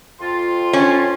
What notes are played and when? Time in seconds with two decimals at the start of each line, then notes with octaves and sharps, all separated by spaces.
0.20 F2 F4 C6
0.73 C#4